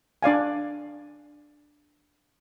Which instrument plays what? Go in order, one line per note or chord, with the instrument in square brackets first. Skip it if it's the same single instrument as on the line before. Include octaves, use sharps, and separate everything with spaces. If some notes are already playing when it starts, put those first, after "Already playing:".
[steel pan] D4 D5 F5 G#5